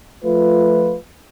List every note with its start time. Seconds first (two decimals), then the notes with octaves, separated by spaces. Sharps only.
0.23 F3 A3 F4 B4